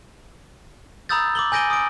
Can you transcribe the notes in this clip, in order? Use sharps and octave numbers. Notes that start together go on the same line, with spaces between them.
A#5 B5 D#6 E6 G6 A6
D6 E6 F#7 G7
G#5 G6 A#6 D7 D#7 G7
D#6 D7